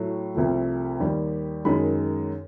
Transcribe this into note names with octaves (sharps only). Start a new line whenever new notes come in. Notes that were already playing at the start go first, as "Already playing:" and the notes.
Already playing: A2 F#3 A3
C2 C3 F3 A3
D#2 D#3 G3
F#2 D#3 G#3 B5